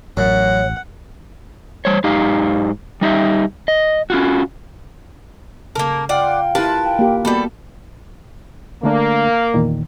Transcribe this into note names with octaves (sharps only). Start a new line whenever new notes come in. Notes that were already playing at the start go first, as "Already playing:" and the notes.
A1 F#2 C#5 F#5
G3 C5 C#5
G#2 D#4 G4 F5
G3 D#4 G4 E5
D#5
C#4 F4 F#4
C#3 A#3 A4 A#4 A5
F4 D5 F#5 G5
E4 F4 G4 A#4 B4 A5
G5
A#3 G4
G3 A#3 B3 F#4 A4 B5
D3 A3 A#3 D4
E2 A#2 D#3